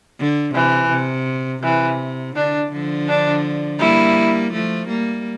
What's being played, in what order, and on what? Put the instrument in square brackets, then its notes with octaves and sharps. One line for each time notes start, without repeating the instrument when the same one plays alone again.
[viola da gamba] D3
[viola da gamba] C3 [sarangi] E3
[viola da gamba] C3
[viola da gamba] C3 [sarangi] E3
[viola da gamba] D3 [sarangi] D4
[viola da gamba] D3 F3
[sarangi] D4
[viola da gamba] G3 A#3 [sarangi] E4
[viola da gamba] F3 A3
G3 A#3